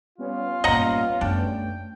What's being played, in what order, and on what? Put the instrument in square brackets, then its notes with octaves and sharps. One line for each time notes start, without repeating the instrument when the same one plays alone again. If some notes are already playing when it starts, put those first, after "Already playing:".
[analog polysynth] G3 B3 C#4 [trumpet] F4
[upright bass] G2 A#2 [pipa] D#5 F#5 A#5
[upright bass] F#2 A3 [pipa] D4 [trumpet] G5